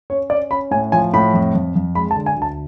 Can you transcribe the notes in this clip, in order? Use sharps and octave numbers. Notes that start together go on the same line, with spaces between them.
C#4 C#5
C#4 D5
C#4 B5
A2 G#5
F3 G#5
A2 B5
F2
F2
F2
G#3 B5
A5
D3
G#5
D2
A5